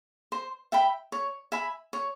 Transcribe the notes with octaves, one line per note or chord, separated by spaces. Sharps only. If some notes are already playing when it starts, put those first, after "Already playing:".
C5
E5 G5 B5
C#5
E5 G#5 B5
C#5